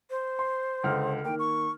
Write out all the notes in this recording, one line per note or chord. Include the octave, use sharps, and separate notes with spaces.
C5
C6
C#2 D3 F6
D#3 A#3 G5
C#6